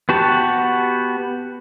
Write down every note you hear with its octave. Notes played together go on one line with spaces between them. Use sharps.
B3 F#4 G4 A5